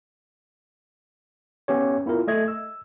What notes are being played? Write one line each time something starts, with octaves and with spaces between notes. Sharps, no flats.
B3 C#4 G4 C#5
B3 E4 F4 A#4
A3 D#5 G#6
E6